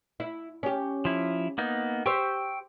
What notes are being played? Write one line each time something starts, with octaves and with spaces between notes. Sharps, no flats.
E4
C#4 G4
F3 E4
A#3 B3 D#4
G4 C5 G5 C#6 E6